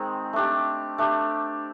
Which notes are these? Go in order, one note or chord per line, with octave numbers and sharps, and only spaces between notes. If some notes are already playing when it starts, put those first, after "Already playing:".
Already playing: D#3 G#3 C4
A3 D4 G4
A3 D4 G4